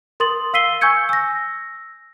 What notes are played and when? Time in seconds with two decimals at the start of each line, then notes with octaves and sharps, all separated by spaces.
0.20 A#4 C6 D#6 A6 F#7
0.53 F5 E6 B6 C7 D#7 G7
0.81 G#5 C#6 E6 G6 G#6 C#7
1.09 E6 A#6